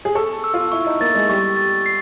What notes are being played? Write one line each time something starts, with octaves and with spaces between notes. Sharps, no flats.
G#4
A4 C#6
E6
F4
E4 C#6
D#4
A#3 A6
G#3
G3 C#6
A6
C7